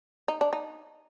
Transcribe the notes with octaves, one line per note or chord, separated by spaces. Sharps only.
D#4
D4
D#4